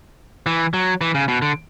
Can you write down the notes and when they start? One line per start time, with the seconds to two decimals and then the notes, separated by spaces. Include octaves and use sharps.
0.46 E3
0.74 F#3
1.01 E3
1.14 C#3
1.28 B2
1.42 D3